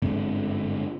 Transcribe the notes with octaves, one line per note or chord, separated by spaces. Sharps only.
G1 G#2 D3 C4